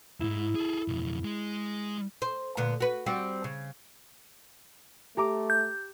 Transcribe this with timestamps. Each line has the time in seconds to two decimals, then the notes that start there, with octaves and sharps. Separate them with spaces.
0.20 F2 G#2 E4
0.55 G#4 A4
0.88 B1 F2
1.24 G#3
2.22 C5
2.57 A#2 D3 B3
2.80 F#4 B4
3.06 G3 C4 F#4
3.44 C#3
5.17 A3 G4 A#5 D6
5.50 G6